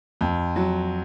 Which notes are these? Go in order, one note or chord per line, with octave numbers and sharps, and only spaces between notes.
F2
F#3